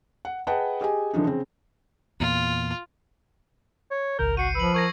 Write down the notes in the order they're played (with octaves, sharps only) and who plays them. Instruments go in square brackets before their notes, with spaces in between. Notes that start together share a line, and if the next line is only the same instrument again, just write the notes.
[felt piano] F#5
G#4 B4 D#5 F#5 G5 A5
G4 G#4 D#5 G#5
D3 E3 F3 D4 D#4
C#3 C4
[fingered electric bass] E2 A#2 [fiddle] F4
[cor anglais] C#5
[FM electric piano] G#1 C#2 G6 [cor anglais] A#4
[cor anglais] F#4 [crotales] C7 C#7 D#7
[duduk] F3 [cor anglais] B4 [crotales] E6 F#7
[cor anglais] A#4 [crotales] C#6 G#6 A#6